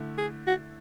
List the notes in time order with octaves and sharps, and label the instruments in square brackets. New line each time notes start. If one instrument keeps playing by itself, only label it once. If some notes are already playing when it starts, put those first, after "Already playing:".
Already playing: [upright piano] D3 A3 E4
[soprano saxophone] G#4
F#4